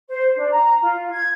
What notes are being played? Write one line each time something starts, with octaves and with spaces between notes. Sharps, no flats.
C5
D4
A#5
F4
G#6